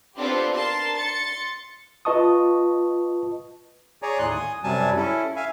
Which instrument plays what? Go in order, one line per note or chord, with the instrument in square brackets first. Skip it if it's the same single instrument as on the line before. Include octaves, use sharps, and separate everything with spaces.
[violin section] B3 C4 D4 F4 G4 A4
A#4 A5 C6
C6 A6 C#7
[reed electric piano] F4 B4 D#5 A5 C#6 D#6
[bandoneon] G#4 C#5 D5 G#5 A#5
D#2 A2 C6 F#6
G#5 D#6
F#2 C3 F#3 G3 G#5 A5
C#4 E4 A4
E5 F5 G#5